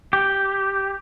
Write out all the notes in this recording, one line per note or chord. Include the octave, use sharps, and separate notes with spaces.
G4